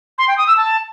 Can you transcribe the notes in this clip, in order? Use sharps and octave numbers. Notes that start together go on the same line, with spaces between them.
C6
G5
D#6
E6
A5